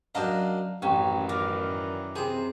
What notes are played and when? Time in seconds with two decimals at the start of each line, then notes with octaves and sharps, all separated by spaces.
0.15 F#2 D4 D#5 F5 A#5
0.82 A1 F#2 D#3 E3 C#4 G5 A#5 C#6
1.29 A#4 D5 F5 D6
2.16 C3 C4 G#4